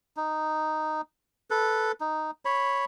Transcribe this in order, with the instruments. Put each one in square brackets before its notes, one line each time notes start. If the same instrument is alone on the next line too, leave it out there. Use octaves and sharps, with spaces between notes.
[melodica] D#4
A4 B4
D#4
C#5 B5